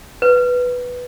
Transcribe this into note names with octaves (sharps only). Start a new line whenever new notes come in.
B4